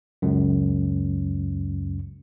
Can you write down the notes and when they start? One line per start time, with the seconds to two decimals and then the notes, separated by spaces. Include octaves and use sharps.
0.22 C#2 F#2